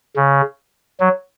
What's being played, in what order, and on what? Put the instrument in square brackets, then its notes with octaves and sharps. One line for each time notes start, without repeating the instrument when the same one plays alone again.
[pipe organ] C#3
F#3